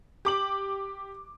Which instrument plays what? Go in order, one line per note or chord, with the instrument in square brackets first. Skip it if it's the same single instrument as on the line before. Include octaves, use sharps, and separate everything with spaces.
[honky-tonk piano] G4 D6 F#7